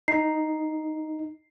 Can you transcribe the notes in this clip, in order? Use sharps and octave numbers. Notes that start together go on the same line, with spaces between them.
D#4 C7